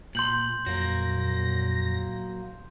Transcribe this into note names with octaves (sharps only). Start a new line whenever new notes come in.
A#2 C6 G6 F#7
F2 A#2 F#3 A#3 A#6